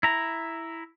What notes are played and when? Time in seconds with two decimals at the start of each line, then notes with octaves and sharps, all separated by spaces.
0.03 E4 A#5